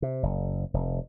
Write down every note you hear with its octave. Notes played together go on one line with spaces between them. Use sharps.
C3
F#1
F1